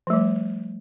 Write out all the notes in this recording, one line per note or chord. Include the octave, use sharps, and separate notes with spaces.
F3 G3 A3